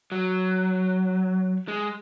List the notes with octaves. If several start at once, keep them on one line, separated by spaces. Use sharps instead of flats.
F#3
G#3